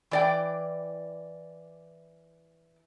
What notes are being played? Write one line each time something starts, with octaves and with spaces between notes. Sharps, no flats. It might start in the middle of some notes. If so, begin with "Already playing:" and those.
E3 D5 G5